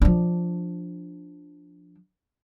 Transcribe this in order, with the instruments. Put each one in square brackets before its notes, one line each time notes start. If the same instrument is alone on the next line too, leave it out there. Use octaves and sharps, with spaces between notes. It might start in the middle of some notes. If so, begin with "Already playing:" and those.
[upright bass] F3 D4